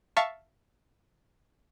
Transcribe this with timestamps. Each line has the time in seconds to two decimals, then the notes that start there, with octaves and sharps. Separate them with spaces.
0.16 E5 F5 A5 C#6